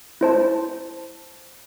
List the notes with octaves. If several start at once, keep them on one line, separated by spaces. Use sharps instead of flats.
E4 C5 A5